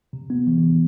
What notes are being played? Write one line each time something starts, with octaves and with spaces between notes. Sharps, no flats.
C3
B3
E3
C3